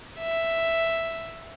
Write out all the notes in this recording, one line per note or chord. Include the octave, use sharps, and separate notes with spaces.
E5